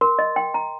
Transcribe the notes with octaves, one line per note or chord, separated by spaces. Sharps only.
A#4 C6
D#5
G5
A#5